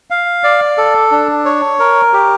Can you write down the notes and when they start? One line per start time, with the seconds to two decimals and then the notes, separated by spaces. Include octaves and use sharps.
0.10 F5
0.44 D5
0.78 A4
1.11 D4
1.45 C#5
1.79 A#4
2.13 G4